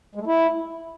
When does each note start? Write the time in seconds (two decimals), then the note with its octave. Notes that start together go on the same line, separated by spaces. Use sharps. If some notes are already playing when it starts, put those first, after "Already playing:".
0.15 G#3
0.21 A3
0.27 E4